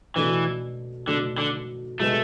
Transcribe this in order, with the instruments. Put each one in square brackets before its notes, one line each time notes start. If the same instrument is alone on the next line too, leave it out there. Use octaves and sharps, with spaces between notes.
[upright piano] B2 A3 D4 F#4 A4 [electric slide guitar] E3
[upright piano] B2 A3 D4 F#4 A4 [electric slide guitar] D3
[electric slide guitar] D3
[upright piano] B2 G#3 B3 [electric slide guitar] A3